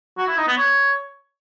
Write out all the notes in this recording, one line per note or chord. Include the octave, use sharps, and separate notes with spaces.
F#4
E4
D#4
B3
C#5